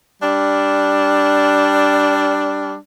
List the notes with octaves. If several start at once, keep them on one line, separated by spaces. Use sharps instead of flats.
G3 D4